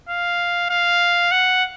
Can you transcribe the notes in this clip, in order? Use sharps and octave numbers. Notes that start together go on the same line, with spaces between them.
F5
F5
F#5